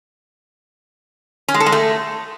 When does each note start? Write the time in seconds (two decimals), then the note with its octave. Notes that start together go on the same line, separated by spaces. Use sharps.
1.48 C#4
1.54 G#3
1.60 A4
1.66 G#3
1.72 A3